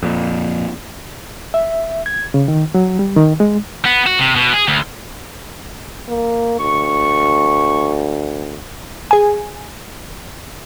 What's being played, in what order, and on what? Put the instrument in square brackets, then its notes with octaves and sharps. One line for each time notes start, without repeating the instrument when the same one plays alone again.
[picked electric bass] F2 A#2
[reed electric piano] E5
G#6
C#3
D#3
F#3
G3
D#3
G#3
[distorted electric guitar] B3
F#4
C3
B2
G#4
D2
[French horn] A#3
[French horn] D2 [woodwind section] C#6
[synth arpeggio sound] G#4 G#5